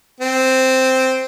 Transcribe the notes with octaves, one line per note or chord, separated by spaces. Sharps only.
C4